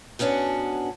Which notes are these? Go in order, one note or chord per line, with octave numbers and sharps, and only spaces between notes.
G#2 B3 C#4 D4 F#4